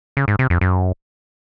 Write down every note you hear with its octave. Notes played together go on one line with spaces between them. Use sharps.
C#3
G#2
C3
F2
F#2